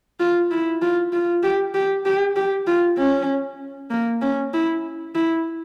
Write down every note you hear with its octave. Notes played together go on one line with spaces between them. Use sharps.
F4
E4
F4
F4
G4
G4
G4
G4
F4
C#4
A#3
C#4
E4
E4